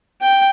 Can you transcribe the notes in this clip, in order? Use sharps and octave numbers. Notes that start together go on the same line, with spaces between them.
G5